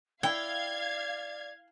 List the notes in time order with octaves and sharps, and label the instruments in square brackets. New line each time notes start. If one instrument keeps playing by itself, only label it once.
[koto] E4 [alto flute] D5 [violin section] F5 G#6 [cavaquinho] G5